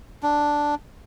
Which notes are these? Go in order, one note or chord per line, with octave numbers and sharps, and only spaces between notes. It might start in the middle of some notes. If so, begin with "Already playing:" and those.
D4